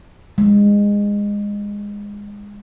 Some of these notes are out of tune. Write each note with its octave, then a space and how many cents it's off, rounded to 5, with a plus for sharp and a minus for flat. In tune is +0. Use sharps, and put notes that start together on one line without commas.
G#3 -20